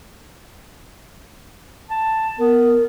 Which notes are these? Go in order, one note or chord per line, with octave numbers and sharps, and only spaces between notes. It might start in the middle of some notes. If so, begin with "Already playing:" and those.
A5
B3 A#4